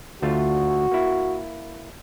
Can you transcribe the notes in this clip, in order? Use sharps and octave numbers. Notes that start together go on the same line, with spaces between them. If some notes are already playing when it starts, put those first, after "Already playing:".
D2 A3 F4 F#4
A#3 E4